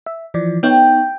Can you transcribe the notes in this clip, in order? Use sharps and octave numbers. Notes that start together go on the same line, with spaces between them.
E5
E3 F3 D5
B3 D#4 C#5 G5